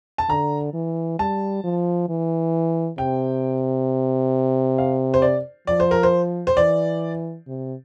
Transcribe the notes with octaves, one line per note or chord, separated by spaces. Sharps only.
A5
D3 A#5
E3
G3 A5
F3
E3
C3 G5
F5
C5
D5
F3 D5
C5
A#4
C5
C5
E3 D5
C3